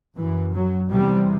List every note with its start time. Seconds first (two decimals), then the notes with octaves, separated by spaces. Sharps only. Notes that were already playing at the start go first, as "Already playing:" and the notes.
0.18 F#2 E3
0.55 F#3
0.92 E2 C3 G3